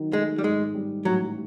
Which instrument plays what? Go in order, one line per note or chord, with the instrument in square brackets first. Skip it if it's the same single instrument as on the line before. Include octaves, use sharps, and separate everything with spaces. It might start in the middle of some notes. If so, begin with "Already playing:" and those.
Already playing: [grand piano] D#3 F#3
[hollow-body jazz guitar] G#3 [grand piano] A3
[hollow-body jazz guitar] G3
[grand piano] G#2 [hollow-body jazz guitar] G#3
[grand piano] G3
[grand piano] A1 [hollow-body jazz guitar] F#3